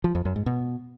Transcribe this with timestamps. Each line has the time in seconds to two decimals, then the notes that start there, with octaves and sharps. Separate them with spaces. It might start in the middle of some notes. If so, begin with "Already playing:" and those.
0.04 F3
0.15 F2
0.25 F#2
0.36 G#2
0.46 B2